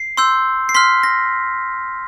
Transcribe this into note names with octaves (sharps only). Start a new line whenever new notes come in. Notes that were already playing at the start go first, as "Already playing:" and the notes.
Already playing: C7
C6 E6 G6
C7
C6 F6 B6
A#6